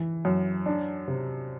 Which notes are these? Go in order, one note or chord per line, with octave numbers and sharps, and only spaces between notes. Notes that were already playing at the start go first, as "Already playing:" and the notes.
Already playing: E3
F#2
D4
C3